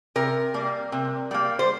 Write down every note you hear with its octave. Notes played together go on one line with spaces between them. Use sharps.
C3 A#4
G3 A#3
C3
G3 A#3
C5